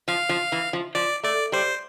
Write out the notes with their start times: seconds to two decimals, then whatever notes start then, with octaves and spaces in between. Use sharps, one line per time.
0.08 F3 F5
0.29 F3
0.52 E3
0.73 F3
0.95 F3 D5
1.23 A3 D5
1.52 G3 C5